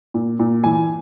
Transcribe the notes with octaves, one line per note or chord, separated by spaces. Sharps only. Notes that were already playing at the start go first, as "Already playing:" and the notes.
A#2
A#2
E3 G#5